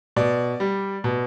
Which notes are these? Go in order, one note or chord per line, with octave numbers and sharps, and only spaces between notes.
B2 D5
G3
B2